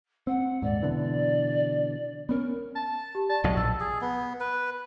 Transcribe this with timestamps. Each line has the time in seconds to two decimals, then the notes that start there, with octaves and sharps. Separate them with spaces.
0.27 C4 F#5
0.62 D#1 G#2 D5
0.83 B2 D3 E3
2.29 B3 C#4 A#4
2.76 A5
3.15 G4
3.29 D5 A5
3.44 B1 A2 F#3 D#5
3.57 A#1 A5 E6
3.80 G#4
4.01 B3
4.40 B4